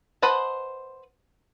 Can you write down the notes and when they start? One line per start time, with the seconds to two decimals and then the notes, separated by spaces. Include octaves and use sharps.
0.22 B4 C5 D#5 F#5 A5